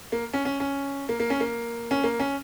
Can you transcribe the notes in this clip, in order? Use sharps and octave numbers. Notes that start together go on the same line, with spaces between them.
A#3
C#4
C#4
C#4
A#3
A#3
C#4
A#3
C#4
A#3
C#4